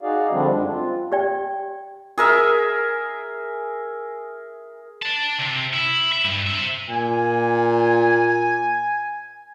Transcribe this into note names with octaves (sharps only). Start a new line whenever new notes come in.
D#4 F#4 G#4 D5 F5
D3 F3 G3 C4 D4
F#2 G#3 D4
C4 F4
G4 D5 G5
G#4 A#4 E5
D5 A5
C3
E4
E5
G2
C4 E5
A#2 G#5